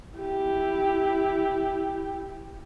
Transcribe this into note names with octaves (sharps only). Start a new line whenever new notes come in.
E4 G4